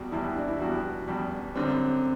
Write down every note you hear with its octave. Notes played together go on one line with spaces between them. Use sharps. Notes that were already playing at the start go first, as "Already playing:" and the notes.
Already playing: E2 B2 G3 F#4
E2 B2 G3 E4
D4
E4
E2 B2 G3 F#4
E2 B2 G3
F#2 D3 G3 C4